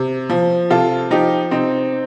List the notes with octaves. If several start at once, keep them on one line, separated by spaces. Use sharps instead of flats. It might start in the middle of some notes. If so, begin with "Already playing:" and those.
Already playing: C3
F3
C3 F4 A4
F3 D#4 G4
C3 C4 D#4